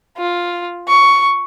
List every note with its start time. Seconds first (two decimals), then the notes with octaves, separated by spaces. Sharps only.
0.17 F4
0.88 C#6